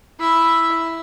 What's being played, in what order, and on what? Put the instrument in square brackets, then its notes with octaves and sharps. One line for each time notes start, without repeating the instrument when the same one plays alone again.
[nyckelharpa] E4 E5